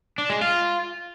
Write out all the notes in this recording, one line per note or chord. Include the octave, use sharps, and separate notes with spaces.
D4
G#3
F4